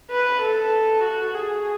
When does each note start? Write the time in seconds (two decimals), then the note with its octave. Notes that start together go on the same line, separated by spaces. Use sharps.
0.11 B4
0.42 A4
1.03 F#4
1.34 G#4